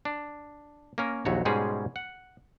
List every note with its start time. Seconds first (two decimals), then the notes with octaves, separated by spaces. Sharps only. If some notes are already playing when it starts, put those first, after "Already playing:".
0.05 D4
0.98 A#3 C#4 A#4
1.25 A#1 D#2 F#3 F#4 C#5
1.45 G#2 B2 G3 G#3 C#4 G#4
1.96 F#5